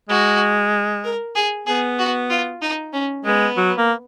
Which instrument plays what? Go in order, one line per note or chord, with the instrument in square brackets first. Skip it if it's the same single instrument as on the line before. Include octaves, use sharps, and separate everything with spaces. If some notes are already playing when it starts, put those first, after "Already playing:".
[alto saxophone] G#3 [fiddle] F#4
[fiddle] A#4
G#4
[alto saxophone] B3 [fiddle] G#4
[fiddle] F#4
F4
D#4
C#4
[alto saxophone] G#3 [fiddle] B3
[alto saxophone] F#3
A#3